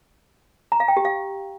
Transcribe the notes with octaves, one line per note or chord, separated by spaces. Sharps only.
A#5
F5
G5
G4
F5